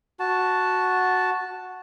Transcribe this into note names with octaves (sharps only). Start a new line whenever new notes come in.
F#4 A5